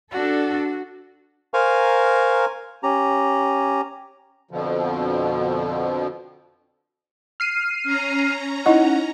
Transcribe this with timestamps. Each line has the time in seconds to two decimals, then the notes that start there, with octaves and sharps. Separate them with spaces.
0.11 D4 F#4 A4
1.54 A#4 C5 F5 G#5 A#5 C#6
2.83 C#4 G4 A#5
4.51 F2 B2 D3 F3
7.40 F6 C7 D#7
7.84 C#4 A#5
8.66 D#4 E4 D#5 F#5